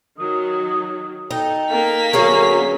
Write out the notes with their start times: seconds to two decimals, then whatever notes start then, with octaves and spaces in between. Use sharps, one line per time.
0.19 D#3 F#3 D#6
1.31 D#4 A4 G5
1.71 A#3 B6
2.13 D3 F#3 B3 C#4 G#4 A#4 C#6